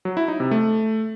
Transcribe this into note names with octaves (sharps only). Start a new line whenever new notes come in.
F#3
E4
D#4
C3
A3